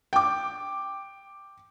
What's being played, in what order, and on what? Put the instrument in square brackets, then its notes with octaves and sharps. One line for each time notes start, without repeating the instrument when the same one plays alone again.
[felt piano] G5 D6